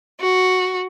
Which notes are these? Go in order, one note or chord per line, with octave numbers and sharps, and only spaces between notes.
F#4